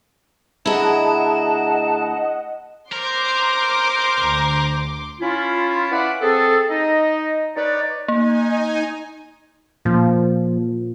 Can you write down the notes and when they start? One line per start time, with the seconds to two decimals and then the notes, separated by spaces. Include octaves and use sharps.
0.66 D2 E4 G#4 D#5 F#5 A5 A#5
2.92 A#4 C5 C6 D6
4.19 D2 D3
5.20 C#4 E4 F4
5.91 F4 B4 D5 E5 F#5
6.21 C4 G#4 A4
6.69 D#4 D#5
7.55 D#4 B4 C#5 D5
8.08 A#3 D#4 G#5
9.85 A#2 F3